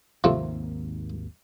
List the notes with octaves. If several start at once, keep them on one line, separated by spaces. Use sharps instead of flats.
G#1 D#2 C3 F3 A3 A#3